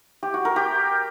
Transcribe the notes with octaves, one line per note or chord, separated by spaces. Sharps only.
G4
F#4
A#4
G4